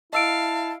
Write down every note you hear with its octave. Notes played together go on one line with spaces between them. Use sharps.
E4 D#5 F5 A5 E6 D7